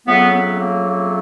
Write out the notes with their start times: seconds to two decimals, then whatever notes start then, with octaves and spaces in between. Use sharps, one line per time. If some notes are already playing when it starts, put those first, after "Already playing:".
0.06 F2 C#3 F#3 A3 B3
0.33 B3
0.61 A#3
0.88 A#3